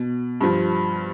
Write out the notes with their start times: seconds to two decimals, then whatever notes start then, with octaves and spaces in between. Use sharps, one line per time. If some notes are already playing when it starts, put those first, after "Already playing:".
Already playing: B2
0.41 G2 F3